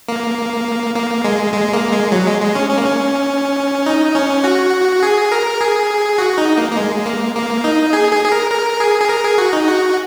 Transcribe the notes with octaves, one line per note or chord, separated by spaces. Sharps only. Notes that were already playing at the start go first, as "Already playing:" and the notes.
A#3
A#3
G#3
G#3
A#3
G#3
F#3
G#3
G#3
C#4
C#4
A#3
C#4
D#4
C#4
F#4
G#4
A#4
G#4
F#4
D#4
A#3
A#3
G#3
A#3
A#3
D#4
G#4
G#4
G#4
A#4
A#4
G#4
G#4
A#4
G#4
F#4
D#4
F#4